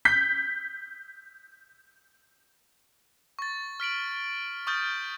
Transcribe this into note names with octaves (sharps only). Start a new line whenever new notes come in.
G6 B6
C#6 A6
F6 B6 D7 F#7
C#6 D#6 F6 G6 A6